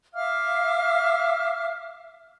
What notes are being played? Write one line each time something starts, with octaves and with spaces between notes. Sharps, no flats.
E5 F5 D6 F6